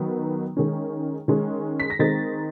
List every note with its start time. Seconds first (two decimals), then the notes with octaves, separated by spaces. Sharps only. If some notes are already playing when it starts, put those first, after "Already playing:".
Already playing: D#3 F#3 B3
0.57 D#3 G#3 C#4
1.28 D#3 G#3 C#4
1.80 B6
1.90 A#6
1.99 D#3 G#3 C4 D#4 A6